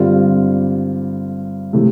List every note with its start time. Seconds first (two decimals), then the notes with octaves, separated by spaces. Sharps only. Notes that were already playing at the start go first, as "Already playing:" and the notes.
Already playing: G2 D3 G3 C4 F4
1.73 C3 E3 A3